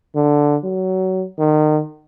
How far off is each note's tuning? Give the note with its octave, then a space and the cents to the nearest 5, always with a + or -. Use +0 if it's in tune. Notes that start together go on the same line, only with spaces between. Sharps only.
D3 +0
F#3 +20
D#3 -30